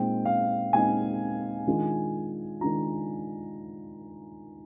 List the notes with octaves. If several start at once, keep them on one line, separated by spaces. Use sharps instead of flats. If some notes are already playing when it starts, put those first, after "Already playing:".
Already playing: A#2 G#3 C4 D#4 G5
F5
A#2 G#3 C4 D#4 G#5
D#3 G#3 D4 F4
D#3 G#3 D4 F4 A#5